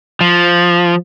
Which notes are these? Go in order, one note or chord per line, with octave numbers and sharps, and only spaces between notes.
F3